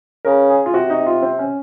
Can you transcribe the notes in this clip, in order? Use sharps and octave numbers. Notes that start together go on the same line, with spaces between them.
C#3 A#4
G#4
F4
C3 F#4
D#4
F4
C4
C#4